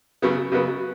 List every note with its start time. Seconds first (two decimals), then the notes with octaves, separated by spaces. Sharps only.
0.22 C#3 F#3 B3
0.52 C#3 F#3 B3